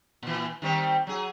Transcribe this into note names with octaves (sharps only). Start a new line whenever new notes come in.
A#2 E3
D#3 G3 C4
F#3 G#4